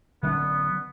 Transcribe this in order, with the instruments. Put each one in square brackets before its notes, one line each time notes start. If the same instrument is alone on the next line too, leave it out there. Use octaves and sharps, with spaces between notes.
[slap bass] D3 F#3 C#4 [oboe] B3